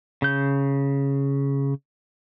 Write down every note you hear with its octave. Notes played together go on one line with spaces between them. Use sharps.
C#3 G6